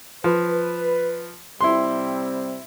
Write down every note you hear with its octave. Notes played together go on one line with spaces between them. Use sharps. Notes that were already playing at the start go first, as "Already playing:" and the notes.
F3 B4
C3 G3 C4 E4 C6